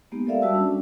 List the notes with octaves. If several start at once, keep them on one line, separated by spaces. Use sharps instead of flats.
G#3 A#3 B3 D#4 G4
G4 A4 A#4 D5 E5 F5
G3 F#4 A5 E6
C#4 D4